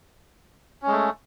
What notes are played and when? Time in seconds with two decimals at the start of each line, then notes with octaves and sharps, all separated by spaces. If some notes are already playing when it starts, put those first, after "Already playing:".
0.82 C#4
0.87 G#3
0.92 A3